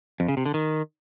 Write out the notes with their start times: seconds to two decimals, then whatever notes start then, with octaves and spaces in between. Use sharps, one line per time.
0.20 F2
0.28 C#3
0.37 C3
0.46 D3
0.54 D#3